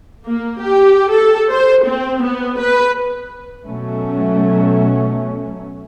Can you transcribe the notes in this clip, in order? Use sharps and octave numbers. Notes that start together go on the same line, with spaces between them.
A#3
G4
A4
C5
C4
B3
B4
B2 F#3 A3 C#4